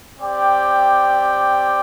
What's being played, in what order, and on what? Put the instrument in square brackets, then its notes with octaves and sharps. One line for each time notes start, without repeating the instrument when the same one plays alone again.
[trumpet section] C4 G4 D5 G5